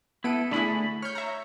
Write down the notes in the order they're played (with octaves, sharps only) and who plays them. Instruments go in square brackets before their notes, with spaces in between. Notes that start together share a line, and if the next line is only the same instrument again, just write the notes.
[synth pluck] B3 D7 D#7 [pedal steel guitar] E4 A4
[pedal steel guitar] D3 A3 B5 [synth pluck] D4 E4 G#4
[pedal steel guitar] C#5 [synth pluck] F6 G6
[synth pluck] E5 A#5